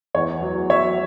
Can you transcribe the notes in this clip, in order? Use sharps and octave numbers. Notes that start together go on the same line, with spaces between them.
E2 C#5
F#3
F#3 C#5 E5